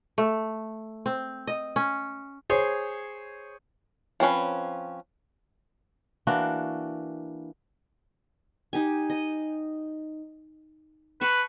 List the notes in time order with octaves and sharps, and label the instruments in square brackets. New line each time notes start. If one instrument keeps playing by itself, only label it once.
[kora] A3
C4
D#5
C#4
[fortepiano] G#4 C5 C#5
[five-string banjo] F3 C4 C#4 B4
[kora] E3 A#3 D4 F#4
[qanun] D#4 G4 G#5
D#5
[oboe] B4 [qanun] A5 C#6